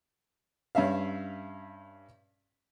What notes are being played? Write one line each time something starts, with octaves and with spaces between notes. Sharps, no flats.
G2 C#4 E5 F5